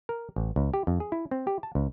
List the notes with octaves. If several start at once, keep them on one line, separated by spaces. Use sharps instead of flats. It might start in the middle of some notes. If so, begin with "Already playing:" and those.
A#4
A1
C#2
G4
F2
G#4
E4
C4
G4
A5
C#2